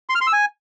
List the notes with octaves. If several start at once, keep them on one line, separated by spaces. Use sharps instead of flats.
C6
F6
C6
E6
G#5